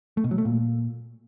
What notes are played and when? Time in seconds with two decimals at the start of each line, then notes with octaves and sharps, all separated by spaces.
0.17 A3
0.24 B2
0.31 F#3
0.38 A3
0.45 A#2